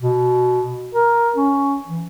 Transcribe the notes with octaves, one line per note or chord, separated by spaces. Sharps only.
B2
A#4
C#4
E3